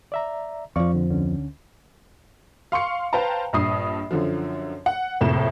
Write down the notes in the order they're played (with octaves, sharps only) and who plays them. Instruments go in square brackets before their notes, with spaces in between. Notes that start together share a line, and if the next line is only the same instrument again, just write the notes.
[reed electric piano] D5 E5 A#5
[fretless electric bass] F2 F3 [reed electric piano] D5 F5 C#6
[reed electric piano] D3
D2 D3 C#4
[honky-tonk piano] F5 C6 C#6 C#7
B4 C5 F5 G5 A5 A#5
A#1 G2 D#6 C7
F#2 D3 F3
F#5
F#1 C2 F2 A2 C3 E7